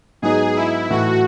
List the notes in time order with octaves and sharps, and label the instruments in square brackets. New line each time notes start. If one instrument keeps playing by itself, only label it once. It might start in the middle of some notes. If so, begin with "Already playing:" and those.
[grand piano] G#2 F#3 B3 D#4 [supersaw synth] G#4
[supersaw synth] E4
[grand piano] A2 E3 A3 [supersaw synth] F#4